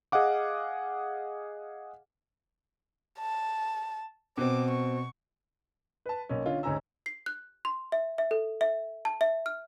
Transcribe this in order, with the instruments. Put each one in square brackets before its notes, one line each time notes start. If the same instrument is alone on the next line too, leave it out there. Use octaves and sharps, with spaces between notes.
[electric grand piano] G#4 D#5 F5 F#5 D6
[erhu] A5
[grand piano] B2 C4 [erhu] D6
[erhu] C#6
[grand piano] B4 A5
B1 A#3 C#4
D3 C#4 F4
D2 G#2 C#4 G#5 A#5 E6
[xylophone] C7
F#6
C6
E5
E5
A4
E5
A5
E5
F6